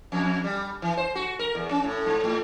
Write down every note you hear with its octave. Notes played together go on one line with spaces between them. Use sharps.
F2
G3
E3
C5
F#4
A#4
E2
C#4
A2
G#2
A2